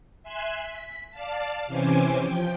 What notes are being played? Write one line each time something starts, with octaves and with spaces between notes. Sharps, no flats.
E5 G#5 C6 E6 F#6
B6
D5 F5 A5
C3 E3 C#4 C5 G#5 D6
F3 G5